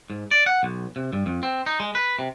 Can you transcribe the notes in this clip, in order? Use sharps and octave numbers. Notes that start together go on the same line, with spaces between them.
G#2
D5
F#5
B1
C3
G2
F2
C4
D#4
G#3
B4
C3